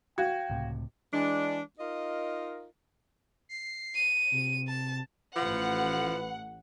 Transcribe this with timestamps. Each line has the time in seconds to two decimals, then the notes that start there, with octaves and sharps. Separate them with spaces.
0.18 F#4 F5 G5 G#6
0.50 C#2 A2 C3
1.12 E3 G#3 D4
1.79 D#4 F4 A#4 D#5
3.49 C7
3.96 D#7
4.31 C3
4.68 A5
5.36 A1 F3 B4 F#5